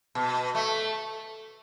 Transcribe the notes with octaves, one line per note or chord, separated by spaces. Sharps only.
B2
A3